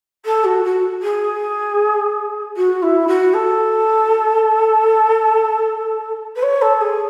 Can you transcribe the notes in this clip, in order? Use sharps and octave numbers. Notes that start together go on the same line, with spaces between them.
A4
F#4
F#4
G#4
F#4
E4
F#4
A4
B4
C#5
A4
G#4